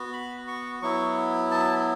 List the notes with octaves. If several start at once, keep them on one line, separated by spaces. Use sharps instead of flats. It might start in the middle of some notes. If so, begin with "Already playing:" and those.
Already playing: B3 F#4
B5
C#6
F#3 B3 E4 C#6
A5